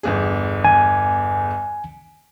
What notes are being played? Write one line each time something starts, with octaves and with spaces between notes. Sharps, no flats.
G1 E2 G#4
G#5